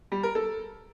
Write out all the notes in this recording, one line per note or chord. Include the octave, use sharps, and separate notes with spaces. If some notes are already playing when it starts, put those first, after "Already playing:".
G3
A#4
A4